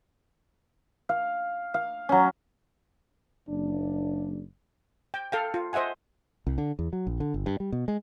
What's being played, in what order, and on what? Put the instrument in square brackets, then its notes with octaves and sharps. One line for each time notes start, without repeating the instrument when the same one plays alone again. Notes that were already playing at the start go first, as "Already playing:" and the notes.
[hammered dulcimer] F5
F5
F#3 C#4
[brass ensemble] F#1 D4
[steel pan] G5
A4 F5 G5
F4
C5 D#5 E5 F#5 G#5
[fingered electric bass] C2
D3
E2
F#3
A#1
D3
G1
G2
G3
B2
G#3